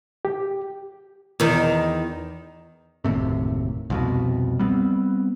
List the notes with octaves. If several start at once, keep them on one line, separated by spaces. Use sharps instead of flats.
G4
E2 D#3
F#1 D#2 A2 C3
C2 F2 B2
G3 B3 C4